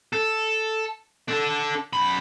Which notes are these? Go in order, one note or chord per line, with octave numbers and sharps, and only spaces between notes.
A4
D4 A4
F#2 B5